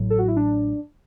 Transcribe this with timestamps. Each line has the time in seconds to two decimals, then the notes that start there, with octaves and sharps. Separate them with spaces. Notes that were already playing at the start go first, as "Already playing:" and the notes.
Already playing: A1 A2 F#3
0.10 A4
0.19 F#4
0.28 E4
0.36 D4